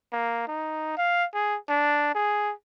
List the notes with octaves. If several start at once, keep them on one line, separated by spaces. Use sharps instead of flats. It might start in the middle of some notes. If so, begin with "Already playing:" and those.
A#3
D#4
F5
G#4
D4
G#4